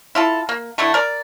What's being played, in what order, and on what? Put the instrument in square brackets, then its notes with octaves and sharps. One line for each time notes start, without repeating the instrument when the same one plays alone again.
[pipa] E4 F4 A4
A#3
D3 A3 D4 E4
A#4 D5